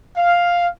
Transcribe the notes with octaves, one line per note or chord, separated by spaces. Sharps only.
F5